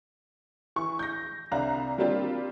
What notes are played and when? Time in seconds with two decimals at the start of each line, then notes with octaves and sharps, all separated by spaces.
0.76 E3 C#6
0.99 G6 A#6
1.52 C2 D4 F5 A#5 F#6
1.98 G3 A#3 C4 D4 F4 G4